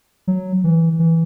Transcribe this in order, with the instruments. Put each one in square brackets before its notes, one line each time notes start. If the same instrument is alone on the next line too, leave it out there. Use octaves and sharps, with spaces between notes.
[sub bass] F#3
E3
E3